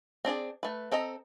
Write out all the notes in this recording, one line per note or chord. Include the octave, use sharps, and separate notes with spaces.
C4 D4 G#4 D5
A3 B4
C4 A4 D#5 A#5